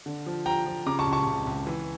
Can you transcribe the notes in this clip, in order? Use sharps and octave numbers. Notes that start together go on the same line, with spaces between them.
D3
F3
F3 G5 A#5
F3
C#3 A#5 D6
A5 C#6
C#2
A5 C#6
C#2
C#2
E3